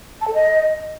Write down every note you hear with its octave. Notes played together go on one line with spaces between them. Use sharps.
A5
A4
D#5